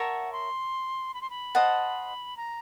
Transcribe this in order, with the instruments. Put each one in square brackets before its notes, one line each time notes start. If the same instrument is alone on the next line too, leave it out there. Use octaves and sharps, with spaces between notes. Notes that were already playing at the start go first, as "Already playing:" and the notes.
Already playing: [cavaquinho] A#4 C#5 E5 A5 [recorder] F#5
[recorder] C6
B5
C6
B5
[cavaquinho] C5 D#5 F#5 A5
[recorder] A#5